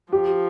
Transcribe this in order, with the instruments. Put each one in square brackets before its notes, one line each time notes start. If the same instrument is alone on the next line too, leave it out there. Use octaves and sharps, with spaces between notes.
[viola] F3 [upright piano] G4